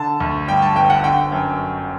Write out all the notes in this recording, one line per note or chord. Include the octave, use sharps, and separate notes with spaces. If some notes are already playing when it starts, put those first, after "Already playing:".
Already playing: D3 A5
D2
G2 G5
A5
G1 G5
F#5
D3 G5
F#2